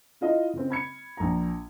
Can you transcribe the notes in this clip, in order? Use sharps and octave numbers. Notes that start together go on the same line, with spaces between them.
E4 F4 D#5
C#3 C4
B5 G#6 C#7
A#1 A#5